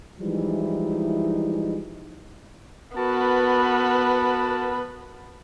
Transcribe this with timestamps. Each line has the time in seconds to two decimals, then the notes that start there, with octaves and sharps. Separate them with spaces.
0.20 E3 F3 G3 G#3 D#4 E4
2.97 B3 F#4 A#4 B4 A5